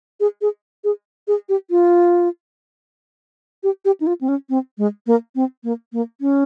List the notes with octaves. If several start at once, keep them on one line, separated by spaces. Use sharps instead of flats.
G#4
G#4
G#4
G#4
G4
F4
G4
G4
D#4
F4
C4
C#4
C4
G#3
A#3
C4
A#3
A#3
C#4